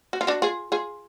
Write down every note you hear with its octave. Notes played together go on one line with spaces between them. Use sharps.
F#4
F4
D4 F#4
F4 G#4
F4 G#4